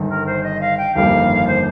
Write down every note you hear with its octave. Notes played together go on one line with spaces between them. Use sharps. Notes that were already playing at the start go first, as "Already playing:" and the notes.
Already playing: G1 G2 D#3
A#4
C5
D#5
F5
G5
G1 F2 D#3 G3 A#3 F5
C5